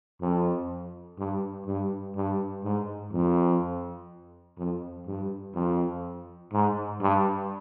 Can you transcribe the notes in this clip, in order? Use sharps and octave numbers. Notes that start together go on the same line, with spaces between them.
F2
G2
G2
G2
G#2
F2
F2
G2
F2
G#2
G2